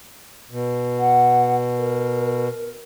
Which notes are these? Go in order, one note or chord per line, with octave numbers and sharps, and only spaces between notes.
B2
F#5
A#4